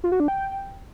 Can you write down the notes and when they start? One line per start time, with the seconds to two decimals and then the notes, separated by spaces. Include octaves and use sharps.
0.04 F4
0.12 F#4
0.20 D4
0.28 G5